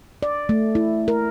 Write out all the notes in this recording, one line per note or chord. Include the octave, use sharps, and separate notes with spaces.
D5
A3
E4
A#4